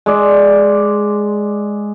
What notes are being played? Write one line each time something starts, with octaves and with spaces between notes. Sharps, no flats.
G#3 D5